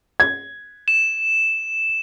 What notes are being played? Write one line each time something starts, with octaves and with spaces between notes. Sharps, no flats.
G#6
E7